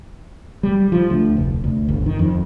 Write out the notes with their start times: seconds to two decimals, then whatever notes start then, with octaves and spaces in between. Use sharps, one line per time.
0.63 G3
0.92 F3
1.10 D2
1.36 F1
1.64 D2
1.89 G1
2.06 D#3
2.19 F2